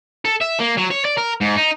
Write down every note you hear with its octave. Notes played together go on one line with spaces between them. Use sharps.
A4
E5
A#3
F#3
C#5
D5
A#4
G#2
D#4